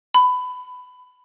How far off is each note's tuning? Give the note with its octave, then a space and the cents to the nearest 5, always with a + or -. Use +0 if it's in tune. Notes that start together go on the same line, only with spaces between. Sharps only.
B5 +20